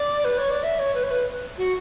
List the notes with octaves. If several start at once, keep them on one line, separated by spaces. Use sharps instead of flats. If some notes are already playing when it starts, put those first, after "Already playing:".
Already playing: D5
B4
C#5
D5
E5
C#5
B4
C#5
B4
F#4